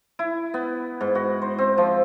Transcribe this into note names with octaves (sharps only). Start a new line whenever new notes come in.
E4
B3
G#2
F#4
C5
C4
F3